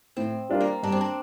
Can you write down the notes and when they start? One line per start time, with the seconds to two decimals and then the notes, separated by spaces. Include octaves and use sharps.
0.17 A2 C4
0.49 G3 D4 F4 A#4
0.61 A#3
0.83 G2 D4
0.92 C4
1.01 D4